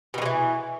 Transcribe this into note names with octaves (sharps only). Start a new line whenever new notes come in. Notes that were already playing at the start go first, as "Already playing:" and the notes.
B2 D#3 E3 G#3